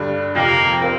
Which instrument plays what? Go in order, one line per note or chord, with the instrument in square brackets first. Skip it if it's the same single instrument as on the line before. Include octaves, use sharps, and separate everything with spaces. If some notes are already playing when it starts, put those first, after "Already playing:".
Already playing: [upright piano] G2 D3 G3
[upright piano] F2 C3 F3 [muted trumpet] A#3
[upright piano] F3 C4 F4 A#4